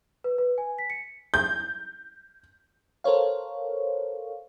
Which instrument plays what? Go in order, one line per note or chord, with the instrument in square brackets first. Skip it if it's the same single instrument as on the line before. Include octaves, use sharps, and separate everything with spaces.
[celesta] B4
B4
G#5
B6
C#7
[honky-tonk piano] G6
[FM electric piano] A4 A#4 C5 C#5 F5